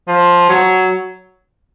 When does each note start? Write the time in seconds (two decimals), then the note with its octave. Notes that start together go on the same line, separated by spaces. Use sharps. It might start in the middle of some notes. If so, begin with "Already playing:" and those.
0.08 F3
0.49 F#3